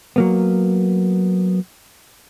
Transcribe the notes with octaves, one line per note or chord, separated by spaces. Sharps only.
F#3 A#3 B3